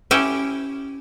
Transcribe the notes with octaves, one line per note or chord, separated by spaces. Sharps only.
C#4 E4 G4